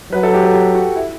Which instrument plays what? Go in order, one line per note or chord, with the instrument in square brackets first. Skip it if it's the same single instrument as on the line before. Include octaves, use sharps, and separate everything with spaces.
[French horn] F#3 [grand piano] B4
[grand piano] A4
G4
A4
G4
F#4
E4